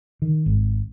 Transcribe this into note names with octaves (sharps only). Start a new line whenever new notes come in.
D#3
G#1